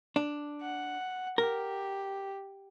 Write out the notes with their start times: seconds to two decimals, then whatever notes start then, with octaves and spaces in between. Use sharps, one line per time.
0.16 D4
0.61 F#5
1.38 G4 A#4